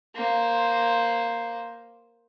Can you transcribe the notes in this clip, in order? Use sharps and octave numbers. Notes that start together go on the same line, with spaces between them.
A#3 C5